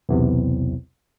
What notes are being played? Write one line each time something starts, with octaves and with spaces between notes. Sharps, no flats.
B1 E2 C3